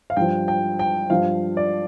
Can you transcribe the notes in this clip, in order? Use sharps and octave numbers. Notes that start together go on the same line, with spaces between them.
F5
G2 F3 G5
G5
G5
G2 F3 F5
D5